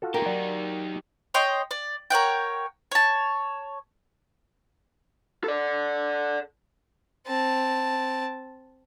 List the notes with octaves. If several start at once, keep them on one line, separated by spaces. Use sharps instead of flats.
F4 F#4 A4
D#4 G4 A#4
F#3 F#4 D5
C#5 D#5 G5 C6
D5
A#4 C#5 F#5 G5
C#5 A5
A4 D5
C4 A5